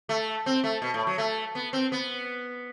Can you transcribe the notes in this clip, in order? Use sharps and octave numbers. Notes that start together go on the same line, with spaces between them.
A3
C4
A3
B2
A2
F#3
A3
B3
C4
B3